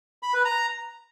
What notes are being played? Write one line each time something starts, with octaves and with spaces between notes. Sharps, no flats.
B5
B4
A#5